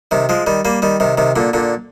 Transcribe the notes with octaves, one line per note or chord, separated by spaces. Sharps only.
C3 D#3
F3 G#3
D#3 G3
G3 A#3
D#3 G3
C3 D#3
C3 D#3
A#2 D3
A#2 D3